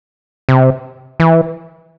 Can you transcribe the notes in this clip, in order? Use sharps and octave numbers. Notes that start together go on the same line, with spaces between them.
C3
E3